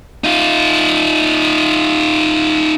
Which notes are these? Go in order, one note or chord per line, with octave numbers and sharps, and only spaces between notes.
D#4 F4